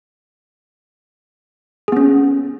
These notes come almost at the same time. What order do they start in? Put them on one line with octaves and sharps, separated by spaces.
G#4 B3 C#4